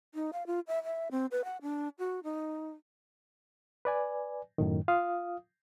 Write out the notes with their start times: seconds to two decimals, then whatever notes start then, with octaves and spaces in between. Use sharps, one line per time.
0.15 D#4
0.33 F5
0.47 F4
0.67 E5
0.84 E5
1.11 C4
1.31 B4
1.44 F#5
1.62 D4
1.99 F#4
2.24 D#4
3.85 B4 D5 G#5
4.58 F#2 A2 D#3
4.88 F4 F5 D#6